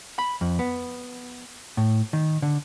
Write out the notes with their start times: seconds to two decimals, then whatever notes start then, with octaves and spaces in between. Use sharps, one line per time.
0.19 B5
0.41 F2
0.59 B3
1.77 A2
2.13 D#3
2.42 D3